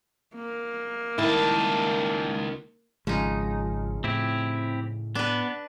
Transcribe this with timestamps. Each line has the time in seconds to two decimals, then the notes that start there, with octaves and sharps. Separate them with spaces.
0.35 A#3
1.18 C#2 D#3 G3 E4 A5
3.07 G#1 C#2 C#3 F3 G#3 D#4
4.04 A2 C4 E4 G4
5.15 B3 D4 B4